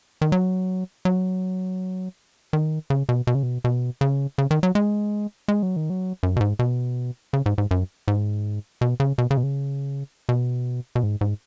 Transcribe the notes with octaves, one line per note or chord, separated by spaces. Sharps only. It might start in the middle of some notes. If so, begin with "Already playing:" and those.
D#3
F#3
F#3
D#3
C#3
B2
B2
C#3
B2
B2
C#3
C#3
D#3
F#3
G#3
G#3
F#3
D#3
F#3
F#2
B2
G#2
B2
C#3
G#2
G#2
F#2
G#2
B2
C#3
B2
C#3
B2
C#3
B2
B2
G#2
G#2